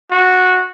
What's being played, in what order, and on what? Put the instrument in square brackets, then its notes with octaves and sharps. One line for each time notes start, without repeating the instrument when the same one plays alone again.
[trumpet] F#4